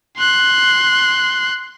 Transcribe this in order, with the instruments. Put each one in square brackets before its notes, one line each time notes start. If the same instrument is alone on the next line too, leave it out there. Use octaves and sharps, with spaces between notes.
[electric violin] C6 F#6